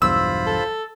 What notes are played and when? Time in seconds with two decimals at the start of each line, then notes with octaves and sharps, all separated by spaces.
0.02 B1 E2 G2 F4 C5 B5 E6
0.47 A4